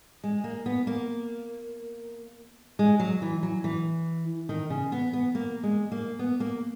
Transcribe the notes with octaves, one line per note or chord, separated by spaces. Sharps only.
G#3
A#3
B3
A#3
G#3
F#3
E3
F#3
E3
D#3
C#3
B3
B3
A#3
G#3
A#3
B3
A#3